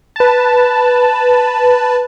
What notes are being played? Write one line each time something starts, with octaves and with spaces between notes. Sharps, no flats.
B4 A5